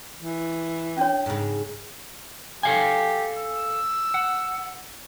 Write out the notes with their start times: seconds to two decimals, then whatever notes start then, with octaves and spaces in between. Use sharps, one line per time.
0.20 E3
0.97 C#4 D4 C#5
1.26 G#2 C#3
2.63 G4 A4 F5 G#5
3.36 E6
4.14 F#5